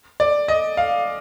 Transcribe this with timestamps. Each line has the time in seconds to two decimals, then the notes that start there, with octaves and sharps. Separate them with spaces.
0.20 D5
0.48 D#5
0.77 F5